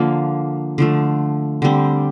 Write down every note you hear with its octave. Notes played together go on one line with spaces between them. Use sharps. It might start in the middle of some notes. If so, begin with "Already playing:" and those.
Already playing: D3 F3 A#3
D3 F3 A3
D3 G3 C4